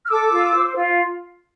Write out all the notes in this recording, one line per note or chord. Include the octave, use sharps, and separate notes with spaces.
F6
A4 D6 E6
F4
C5
F4